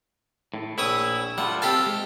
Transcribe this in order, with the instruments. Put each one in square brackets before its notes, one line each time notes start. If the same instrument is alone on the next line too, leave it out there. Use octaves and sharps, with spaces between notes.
[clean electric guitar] A2
[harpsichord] A#1 C#5 D#6 [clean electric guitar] E4
[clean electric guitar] G3 A3 F4 [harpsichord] F#5
[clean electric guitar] C4 E5 A5 [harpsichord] G4 A4 F5
[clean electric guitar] G#3